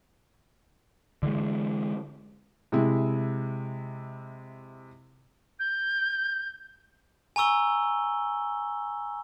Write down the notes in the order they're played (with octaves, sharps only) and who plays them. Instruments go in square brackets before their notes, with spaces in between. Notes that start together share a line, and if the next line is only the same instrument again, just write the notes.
[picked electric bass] D3 E3 G3 G#3
[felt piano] C3 G#3 E4
[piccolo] G6
[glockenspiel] G#5 A#5 C#6 E6 G7